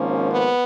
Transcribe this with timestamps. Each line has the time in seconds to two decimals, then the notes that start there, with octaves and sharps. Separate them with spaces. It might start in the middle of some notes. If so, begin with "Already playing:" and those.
Already playing: G#1 G#2 F3 A#3 C#4
0.30 B3